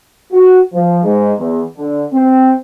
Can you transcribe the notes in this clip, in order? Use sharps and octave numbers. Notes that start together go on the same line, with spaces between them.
F#4
F3
G#2
E2
D3
C4